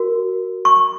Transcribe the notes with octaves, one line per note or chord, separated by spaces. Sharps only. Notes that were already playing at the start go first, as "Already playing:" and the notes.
Already playing: F#4 A#4
C#6